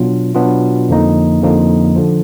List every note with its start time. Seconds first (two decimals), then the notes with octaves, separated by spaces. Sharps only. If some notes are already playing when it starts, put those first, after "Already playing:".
Already playing: B2 F#3 B3 D4 F4
0.35 B2 F#3 B3 D4 F4
0.89 F2 D3 F3 A#3 D#4
1.42 F2 D3 F3 A#3 D#4
1.96 D3 F3